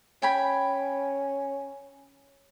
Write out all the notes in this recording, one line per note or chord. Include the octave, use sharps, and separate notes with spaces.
C#4 G5 G#5 B5